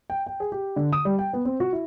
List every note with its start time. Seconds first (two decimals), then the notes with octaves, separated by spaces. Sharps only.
0.10 G5
0.27 G5
0.40 G#4
0.52 G4
0.76 D3
0.92 D#6
1.05 G3
1.19 G5
1.33 B3
1.45 C4
1.60 F#4
1.73 E4